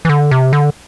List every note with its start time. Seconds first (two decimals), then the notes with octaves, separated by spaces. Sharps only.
0.05 E3
0.09 D3
0.31 C3
0.53 D3